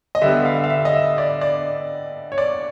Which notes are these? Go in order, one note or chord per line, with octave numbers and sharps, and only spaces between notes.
D#5
D3 G3 B3 E5
F5
F5
E5
D#5
E5
D5
D5
C#5
D5